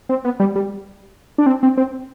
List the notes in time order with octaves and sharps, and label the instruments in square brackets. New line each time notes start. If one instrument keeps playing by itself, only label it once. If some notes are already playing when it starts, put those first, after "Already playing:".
[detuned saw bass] C4
B3
G3
G3
D4
C4
C4
C4